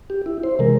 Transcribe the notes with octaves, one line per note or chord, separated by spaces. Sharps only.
G4
E4
C5
C3 E3 G#3 A#4